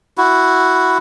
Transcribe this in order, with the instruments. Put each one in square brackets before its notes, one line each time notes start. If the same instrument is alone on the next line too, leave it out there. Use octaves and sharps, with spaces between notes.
[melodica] E4 F#4